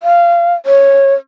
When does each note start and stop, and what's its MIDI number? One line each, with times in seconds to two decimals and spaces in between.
0.03 0.55 77
0.66 1.14 73